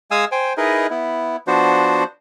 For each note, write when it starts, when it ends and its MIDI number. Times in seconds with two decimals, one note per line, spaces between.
0.11 0.25 56
0.11 0.25 77
0.11 0.25 80
0.11 0.25 87
0.11 0.25 88
0.32 0.53 72
0.32 0.53 79
0.32 0.53 80
0.57 0.87 63
0.57 0.87 64
0.57 0.87 68
0.57 0.87 70
0.57 0.87 71
0.57 0.87 75
0.90 1.36 59
0.90 1.36 64
1.47 2.04 53
1.47 2.04 59
1.47 2.04 62
1.47 2.04 66
1.47 2.04 72